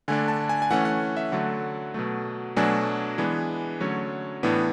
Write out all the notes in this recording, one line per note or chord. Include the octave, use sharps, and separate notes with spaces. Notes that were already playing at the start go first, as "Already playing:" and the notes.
D3 A3 D4 G#5
A5
G#5
G#5
E3 A3 C#4 F#5
F#5
E5
D3 F#3 A3 F#5
B2 F#3 A3
B2 F#3 A3 D4 G#5
E3 G#3 B3 D4
D3 F#3 A3 C#4 C#5
A2 E3 B3 D4